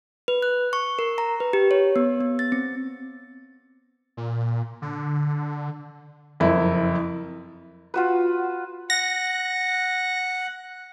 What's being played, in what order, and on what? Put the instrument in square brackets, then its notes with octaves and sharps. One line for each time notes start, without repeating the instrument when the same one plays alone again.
[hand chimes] B4
F#6
C#6
A#4
A#5
B4
G4
C#5
B3
B3
A6
C4
[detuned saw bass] A#2
D3
[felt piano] F#1 F2 E4
[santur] F4 F#4 B4
[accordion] F#5 [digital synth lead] A#6